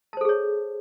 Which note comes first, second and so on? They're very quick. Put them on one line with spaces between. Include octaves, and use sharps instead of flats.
A5 C5 A4 G#4 C#5